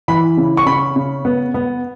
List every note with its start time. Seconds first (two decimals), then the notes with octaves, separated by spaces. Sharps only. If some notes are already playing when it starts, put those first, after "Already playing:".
0.08 E3 B5
0.38 C#3
0.57 C#6
0.66 C#3 B5
0.96 C#3
1.25 B3
1.54 B3